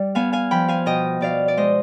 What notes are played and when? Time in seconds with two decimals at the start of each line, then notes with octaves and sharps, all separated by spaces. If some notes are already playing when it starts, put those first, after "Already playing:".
Already playing: G3 D5
0.15 B3 F5 G#5
0.33 F5 G#5
0.51 F3 G5 B5
0.68 F5 G#5
0.86 B2 D#5 G5
1.21 B2 D5 F5
1.48 D5
1.57 G#3 C5 D#5